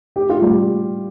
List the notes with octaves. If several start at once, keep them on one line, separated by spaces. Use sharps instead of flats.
G4
F4
G3 G4